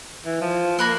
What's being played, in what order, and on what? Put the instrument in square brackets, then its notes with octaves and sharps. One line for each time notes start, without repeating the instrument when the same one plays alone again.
[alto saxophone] E3
F3
[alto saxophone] A#3 [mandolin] A#4 B5 F#6